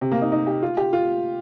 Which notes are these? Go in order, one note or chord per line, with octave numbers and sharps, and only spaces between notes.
C3
A#3
D#4
D#4
G4
F4
G4
F4